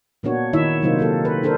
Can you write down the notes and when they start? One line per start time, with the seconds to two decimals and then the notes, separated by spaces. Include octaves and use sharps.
0.23 A#2 A#3 B3 D4 F#4 C#5
0.53 D#3 D#4 E4 C#5 E5
0.82 C3 F#3 A#3 D#4 F4 C5
0.99 A#3 C4 A4
1.25 B4
1.43 D4 A4 A#4 C5